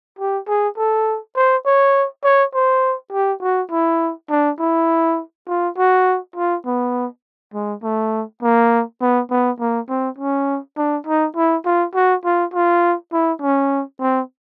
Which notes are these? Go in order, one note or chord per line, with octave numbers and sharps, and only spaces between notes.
G4
G#4
A4
C5
C#5
C#5
C5
G4
F#4
E4
D4
E4
F4
F#4
F4
B3
G#3
A3
A#3
B3
B3
A#3
C4
C#4
D4
D#4
E4
F4
F#4
F4
F4
E4
C#4
C4